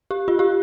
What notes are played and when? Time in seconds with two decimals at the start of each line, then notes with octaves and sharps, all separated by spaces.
0.11 G4
0.28 F4
0.39 G4